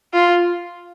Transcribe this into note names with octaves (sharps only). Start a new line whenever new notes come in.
F4